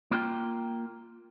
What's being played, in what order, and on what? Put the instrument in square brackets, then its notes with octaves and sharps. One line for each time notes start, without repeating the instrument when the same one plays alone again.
[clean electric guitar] A#3 F4 G5